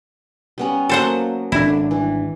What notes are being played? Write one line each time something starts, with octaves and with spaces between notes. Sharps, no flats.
G3 B3 C#4
F#3 A#3 A4 C5 F#5
G#1 D3 D4 E4
E3 G3